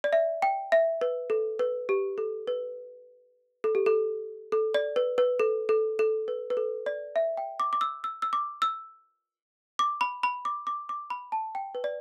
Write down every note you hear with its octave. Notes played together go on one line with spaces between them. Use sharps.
D5
E5
G5
E5
B4
A4
B4
G4
A4
B4
A4
G4
A4
A4
D5
B4
B4
A4
A4
A4
B4
B4
A4
D5
E5
G5
D6
D6
E6
E6
E6
D6
E6
D6
B5
B5
D6
D6
D6
B5
A5
G5
B4
D5